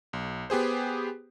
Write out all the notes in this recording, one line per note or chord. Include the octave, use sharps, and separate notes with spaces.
B1
B3 G4 G#4 C5